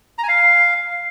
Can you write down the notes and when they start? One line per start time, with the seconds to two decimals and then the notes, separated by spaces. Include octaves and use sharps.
0.18 A#5
0.23 G#5
0.29 F5